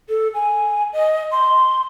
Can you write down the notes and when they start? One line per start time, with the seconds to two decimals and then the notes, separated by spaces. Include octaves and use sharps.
0.09 A4
0.34 G#5
0.93 D#5
1.31 C6